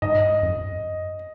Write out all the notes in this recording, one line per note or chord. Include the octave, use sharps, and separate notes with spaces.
G#2 D#5
F#2